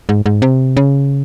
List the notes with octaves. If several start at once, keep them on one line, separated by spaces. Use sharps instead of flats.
G#2
G#2
C3
C#3